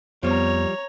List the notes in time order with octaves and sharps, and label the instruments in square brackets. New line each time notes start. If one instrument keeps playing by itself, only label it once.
[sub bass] F2 [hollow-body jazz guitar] F3 G3 [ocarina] B3 [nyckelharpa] C#5 A#5